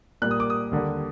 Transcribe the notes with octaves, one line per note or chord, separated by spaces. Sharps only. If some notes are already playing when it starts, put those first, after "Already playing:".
A#2 G3 A#3 F#6
D#6
D6
D#6
D#2 D3 G3 A#3